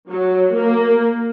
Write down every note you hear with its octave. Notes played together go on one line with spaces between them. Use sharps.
F#3
A#3